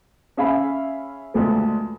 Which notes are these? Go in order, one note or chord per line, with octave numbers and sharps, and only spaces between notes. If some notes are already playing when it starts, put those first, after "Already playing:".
C#4 G#4 E5 F5 G#5 B5
D2 A#2 F3 G#3 A3 B3